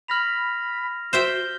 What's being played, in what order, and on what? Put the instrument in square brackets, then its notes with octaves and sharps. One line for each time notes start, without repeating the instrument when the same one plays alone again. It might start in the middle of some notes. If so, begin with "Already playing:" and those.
[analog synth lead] B5 [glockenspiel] F6 A#6 F7
[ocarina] F#4 [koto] C5 E5 G5 [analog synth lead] G6